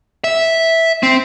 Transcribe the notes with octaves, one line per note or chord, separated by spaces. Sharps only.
E5
C4